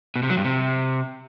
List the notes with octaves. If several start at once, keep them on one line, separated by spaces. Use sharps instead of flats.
B2
C3
F#3
G2
C3